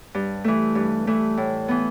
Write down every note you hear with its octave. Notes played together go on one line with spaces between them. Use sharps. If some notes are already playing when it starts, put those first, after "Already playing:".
G2
E3 A3
G2
E3 A3
A2
E3 B3